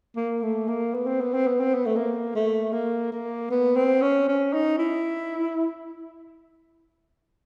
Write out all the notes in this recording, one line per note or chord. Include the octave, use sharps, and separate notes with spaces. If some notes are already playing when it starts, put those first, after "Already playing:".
A#3
A3
A#3
B3
C4
B3
C4
B3
C4
B3
A3
A#3
A3
A#3
A#3
B3
C4
C#4
C#4
D#4
E4